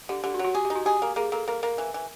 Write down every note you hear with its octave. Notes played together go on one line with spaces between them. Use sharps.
D3 G4
D3 G4
F#4
F#3
F#4
G4 G#4
G4
D#4
F#4
G4 G#4
A#3
A#3 G#4
A#3 A4
A#3 A#4
A#3 A#4
E3
E3